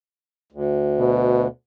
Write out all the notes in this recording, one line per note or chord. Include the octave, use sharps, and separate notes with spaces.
D2
B2